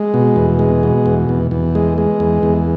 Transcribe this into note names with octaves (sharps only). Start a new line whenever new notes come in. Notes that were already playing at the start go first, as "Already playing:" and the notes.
Already playing: G#3
B2
E2
G#3
B2
E2
E2
E2
G#3
G#3
E2
E2